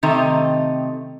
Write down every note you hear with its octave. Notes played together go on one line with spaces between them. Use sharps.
C3 D#3 A3 C4 D#5 A#5